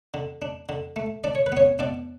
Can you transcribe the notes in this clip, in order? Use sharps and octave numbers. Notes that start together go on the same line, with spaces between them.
D3
D4
D3
A3
D4 D5
C#5
B4
B3 C#4 C#5
B2 D4 D5